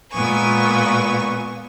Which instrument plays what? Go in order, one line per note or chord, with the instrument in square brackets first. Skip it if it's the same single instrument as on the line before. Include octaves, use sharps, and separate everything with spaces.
[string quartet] A#2 G#3 B3 G#5 C#6